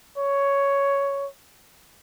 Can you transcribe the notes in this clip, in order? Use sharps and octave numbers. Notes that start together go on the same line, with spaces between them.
C#5